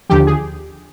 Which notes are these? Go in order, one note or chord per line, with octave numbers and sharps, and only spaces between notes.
D#2 D3 F3 G4
G#4